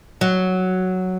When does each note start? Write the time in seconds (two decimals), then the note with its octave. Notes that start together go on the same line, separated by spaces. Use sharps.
0.21 F#3